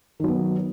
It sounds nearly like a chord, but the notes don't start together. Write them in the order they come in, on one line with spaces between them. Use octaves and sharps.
D#3 F#3 B3